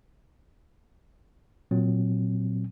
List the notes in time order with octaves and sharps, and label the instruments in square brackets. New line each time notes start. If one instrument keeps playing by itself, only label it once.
[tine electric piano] A#2 F#3 C4